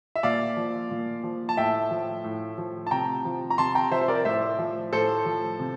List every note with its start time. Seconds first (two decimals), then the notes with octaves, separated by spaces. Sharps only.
0.16 E5
0.23 A#2 D5 F5
0.57 F3
0.91 A#2
1.24 F3
1.49 A5
1.57 A2 E5 G5
1.91 F3
2.24 A2
2.58 F3
2.87 A5
2.91 C3 G5 A#5
3.25 F3
3.50 A#5
3.58 C3 A5 C6
3.75 G5 A#5
3.91 F3 C5 E5
4.01 C5
4.08 A#4 D5
4.25 A2 C5 E5
4.59 F3
4.93 A2 A4 C5
5.26 F3
5.60 C3